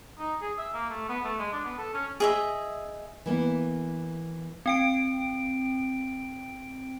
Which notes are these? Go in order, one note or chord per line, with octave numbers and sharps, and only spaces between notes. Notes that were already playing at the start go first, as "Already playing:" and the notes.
D#4
G#4
E5
A#3
A3
B3
A3
G#3
D4
B3
A4
C#4
G#4 D#5 E5
E3 A#3 B3 E4
C4 G5 D7